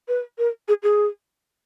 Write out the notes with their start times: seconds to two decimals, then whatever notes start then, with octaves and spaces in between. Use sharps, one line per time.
0.08 B4
0.38 A#4
0.68 G#4
0.83 G#4